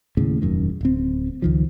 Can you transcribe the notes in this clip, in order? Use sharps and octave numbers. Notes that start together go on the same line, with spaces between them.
D#2 A2 C#3
E1 F#2 D#3
D1 C4
C#2 D#3 F3